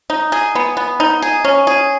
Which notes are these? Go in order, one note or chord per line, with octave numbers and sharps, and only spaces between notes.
D#4
G#4
B3
B3
D#4
G#4
C#4
G#4